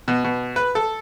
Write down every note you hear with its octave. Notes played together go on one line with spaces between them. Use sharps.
B2
B2
B4
A4